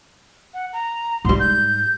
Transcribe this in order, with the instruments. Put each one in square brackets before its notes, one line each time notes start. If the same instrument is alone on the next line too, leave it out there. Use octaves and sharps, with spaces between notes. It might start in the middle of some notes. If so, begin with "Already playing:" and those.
[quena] F#5
A#5
[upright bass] G#2 G3 [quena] C6
[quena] G6